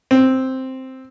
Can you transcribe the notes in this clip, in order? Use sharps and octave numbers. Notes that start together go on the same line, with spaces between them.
C4